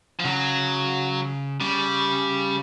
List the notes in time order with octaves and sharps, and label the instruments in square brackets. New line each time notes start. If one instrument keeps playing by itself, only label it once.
[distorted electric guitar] F3
[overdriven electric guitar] C#3 [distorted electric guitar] F#3
[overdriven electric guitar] C#3 [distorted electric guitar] G3